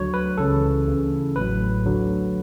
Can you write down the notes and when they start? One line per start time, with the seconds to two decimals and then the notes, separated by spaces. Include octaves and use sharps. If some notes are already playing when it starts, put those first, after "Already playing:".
Already playing: D2 D3 F#3 C#5
0.14 B4
0.38 C#2 C#3 E3 A4
0.87 D2 C#3 E3
1.36 A1 A2 F#3 B4
1.85 D2 D3 F#3